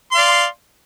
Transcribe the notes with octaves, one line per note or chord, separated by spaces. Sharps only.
D5 F5 C6